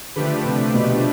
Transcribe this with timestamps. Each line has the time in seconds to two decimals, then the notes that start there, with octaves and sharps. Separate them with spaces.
0.16 D3 F3 A3 D4 G4 B4
0.45 C3
0.74 B2